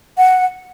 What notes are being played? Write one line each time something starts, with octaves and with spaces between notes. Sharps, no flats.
F#5